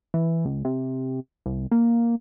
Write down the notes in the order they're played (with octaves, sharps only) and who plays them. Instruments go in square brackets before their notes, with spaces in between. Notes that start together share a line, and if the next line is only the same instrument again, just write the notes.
[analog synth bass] E3
C#2
C3
C2
A#3